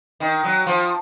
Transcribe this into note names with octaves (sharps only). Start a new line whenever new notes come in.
D#3
F#3
F3